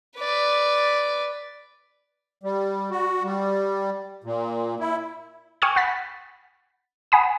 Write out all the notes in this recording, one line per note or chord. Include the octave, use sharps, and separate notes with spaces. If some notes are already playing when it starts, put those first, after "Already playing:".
B4 D5
G3
F#4
G3
A#2
E4
G5 G#5 C#6 D#6 F6 G#6
F#5 B5 A6 B6
F#5 G#5 B5 D#6